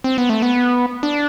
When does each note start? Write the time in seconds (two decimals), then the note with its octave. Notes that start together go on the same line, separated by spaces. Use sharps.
0.04 C4
0.18 B3
0.29 A3
0.42 B3
1.03 D4